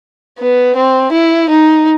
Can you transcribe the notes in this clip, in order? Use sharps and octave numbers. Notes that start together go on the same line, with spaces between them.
B3
C4
E4
D#4